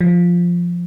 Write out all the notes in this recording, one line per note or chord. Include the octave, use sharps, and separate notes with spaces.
F3